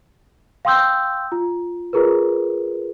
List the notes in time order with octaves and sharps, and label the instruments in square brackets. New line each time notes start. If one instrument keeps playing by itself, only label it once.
[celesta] F5 G5 C6 D#6 E6 G6
F4
F4 G#4 A#4 B4